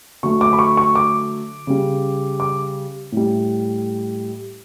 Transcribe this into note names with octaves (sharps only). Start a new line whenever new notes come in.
D3 F#3 A3 C#6
D6
B5
C#6
C#6
D6
C#3 G3
D6
A2 G3